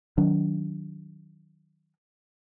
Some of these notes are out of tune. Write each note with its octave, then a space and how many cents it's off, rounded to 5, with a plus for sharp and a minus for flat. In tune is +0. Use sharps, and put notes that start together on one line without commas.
D#3 +0 F#3 +0 D4 -30